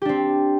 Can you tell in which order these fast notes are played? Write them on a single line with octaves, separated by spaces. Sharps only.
G4 D4 C4